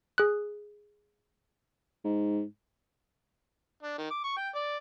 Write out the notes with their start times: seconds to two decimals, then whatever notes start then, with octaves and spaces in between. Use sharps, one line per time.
0.18 G#4 F#6
2.04 G#2
3.83 D4
3.98 D#3
4.11 D6
4.24 C#6
4.37 G5
4.55 D5